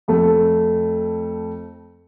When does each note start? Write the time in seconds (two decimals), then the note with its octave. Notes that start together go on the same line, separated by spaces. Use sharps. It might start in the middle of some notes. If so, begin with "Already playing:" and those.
0.08 F2 A3